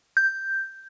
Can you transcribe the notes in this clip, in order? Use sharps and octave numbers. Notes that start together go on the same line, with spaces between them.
G6